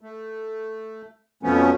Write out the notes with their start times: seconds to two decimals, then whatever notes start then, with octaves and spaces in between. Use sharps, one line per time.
0.01 A3
1.43 F2 B2 F3 A3 B3 C#4